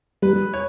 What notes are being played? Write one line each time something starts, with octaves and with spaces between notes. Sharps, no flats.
G3 B4
C#5